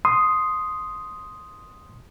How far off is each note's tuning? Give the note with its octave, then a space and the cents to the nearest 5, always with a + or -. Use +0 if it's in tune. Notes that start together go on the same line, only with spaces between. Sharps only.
C6 +0 D#6 +0